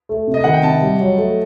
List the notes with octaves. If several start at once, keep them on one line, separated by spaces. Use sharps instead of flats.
A3
C3
D#5
D#3 F#5
G5
C3 A5
G3
F#3
A3